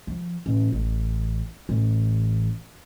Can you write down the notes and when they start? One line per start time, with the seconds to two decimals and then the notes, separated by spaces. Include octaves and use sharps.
0.07 F3
0.46 A1
0.72 A1
1.69 A1